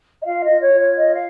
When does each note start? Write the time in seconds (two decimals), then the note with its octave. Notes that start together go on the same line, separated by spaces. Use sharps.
0.22 D#5
0.25 F4 F5
0.44 D#5
0.50 F4
0.61 C#5
0.73 F4
0.79 C#5
0.97 C#5 D#5
1.14 F5